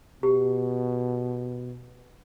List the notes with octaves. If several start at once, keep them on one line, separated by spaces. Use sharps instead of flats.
B2 G4